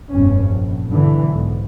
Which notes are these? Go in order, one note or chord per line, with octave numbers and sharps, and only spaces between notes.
F1 B1 G2 C#4
A#1
B1 G2 D3 E3
B1 G#2